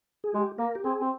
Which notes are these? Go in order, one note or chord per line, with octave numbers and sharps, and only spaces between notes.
G#4
G#3 G4
A#3 A#4
G4
C4 G#4
C4